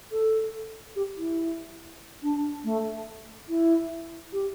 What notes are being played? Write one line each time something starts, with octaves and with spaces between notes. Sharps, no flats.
A4
G4
E4
D4
A3
E4
G4